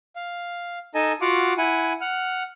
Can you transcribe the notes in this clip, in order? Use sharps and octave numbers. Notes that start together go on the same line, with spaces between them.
F5
D#4 A4 D#5 G#5 A5
F4 F#4 F5 F#5 D6
E4 F#5 G#5
F#5 F6